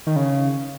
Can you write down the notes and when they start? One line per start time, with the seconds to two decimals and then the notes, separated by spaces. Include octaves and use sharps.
0.07 D#3
0.16 C#3